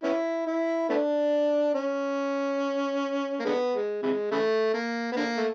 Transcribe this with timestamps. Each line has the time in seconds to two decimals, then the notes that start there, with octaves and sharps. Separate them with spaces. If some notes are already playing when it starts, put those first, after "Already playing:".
0.04 B3 C#4 E4
0.47 E4
0.90 A3 B3 D4
1.74 C#4
3.40 A#3
3.45 D3 G#3 B3
3.74 G#3
4.02 C3 E3 G#3
4.32 C#3 E3 A3
4.74 A#3
5.12 B3
5.16 D3 A#3
5.37 A3